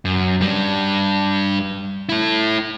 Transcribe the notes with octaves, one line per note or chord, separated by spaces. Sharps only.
F#2
G2 G3
A3 E4